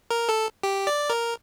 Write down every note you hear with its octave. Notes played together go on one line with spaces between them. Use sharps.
A#4
A4
G4
D5
A#4